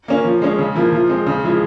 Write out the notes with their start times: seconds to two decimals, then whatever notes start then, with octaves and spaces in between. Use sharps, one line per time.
0.08 A#3 C#4
0.25 F3
0.42 G#3 C#4
0.59 C#3
0.75 F3 A#3 E4
0.92 F3
1.09 G#3 C4
1.27 C#3
1.43 F3 G#3 E4